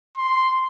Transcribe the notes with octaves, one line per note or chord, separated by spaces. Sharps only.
C6